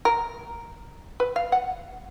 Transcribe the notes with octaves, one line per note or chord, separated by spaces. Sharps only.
A#4
B4
F5
F#5